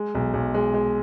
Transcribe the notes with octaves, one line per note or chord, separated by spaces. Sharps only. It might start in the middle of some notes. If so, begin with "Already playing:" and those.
Already playing: G#3
B1
B1
G#3
G#3